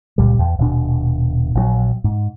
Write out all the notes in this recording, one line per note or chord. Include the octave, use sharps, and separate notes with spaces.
C#2 A#2 G3
E2
D#1 B2 D4
A#1 D#3 F#3
G#2